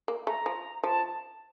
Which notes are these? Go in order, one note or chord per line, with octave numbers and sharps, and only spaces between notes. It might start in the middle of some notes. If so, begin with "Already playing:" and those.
A#3
A3 A#5
F3
F3 A5